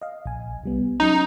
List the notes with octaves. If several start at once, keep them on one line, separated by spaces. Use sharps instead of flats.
D#5 F5
A#1 G#5
C2 G3 B3
F#3 C#4 D#4